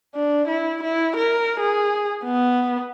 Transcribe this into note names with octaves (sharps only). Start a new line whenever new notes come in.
D4
E4
E4
A#4
G#4
B3